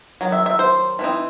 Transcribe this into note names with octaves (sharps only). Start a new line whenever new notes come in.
D#3 F#3
E5
E5
C5
E3 A3 C4 D#4